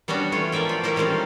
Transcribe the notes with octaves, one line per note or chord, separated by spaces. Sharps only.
G3 B3 C#4 D4 F#4
E3 A3 F4 C#5
F3 A#3 D5 E5 G5
F4
E3 G3 A3 E4 A#4
D#3 G3 C4 C#4 F4